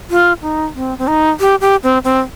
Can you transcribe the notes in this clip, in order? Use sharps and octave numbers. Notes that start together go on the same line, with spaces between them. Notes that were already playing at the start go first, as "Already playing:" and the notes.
F4
D#4
C4
C4
D#4
G4
G4
C4
C4